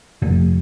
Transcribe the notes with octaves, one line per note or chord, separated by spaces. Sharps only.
F1